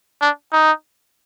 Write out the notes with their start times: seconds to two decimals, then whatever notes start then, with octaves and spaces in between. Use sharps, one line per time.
0.21 D4
0.53 D#4